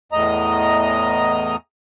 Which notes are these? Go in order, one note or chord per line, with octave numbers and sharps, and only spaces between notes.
E2 A2 D#5 A#5